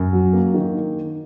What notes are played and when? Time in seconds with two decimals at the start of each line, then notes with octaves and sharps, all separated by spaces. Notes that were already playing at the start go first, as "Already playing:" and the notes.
Already playing: F#2
0.13 F#3
0.33 A#3
0.54 D#3